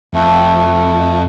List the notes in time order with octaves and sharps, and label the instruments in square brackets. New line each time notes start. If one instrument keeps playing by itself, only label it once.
[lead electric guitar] F2 [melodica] A3